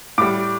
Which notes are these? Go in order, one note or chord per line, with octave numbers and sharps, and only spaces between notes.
A2 G3 D6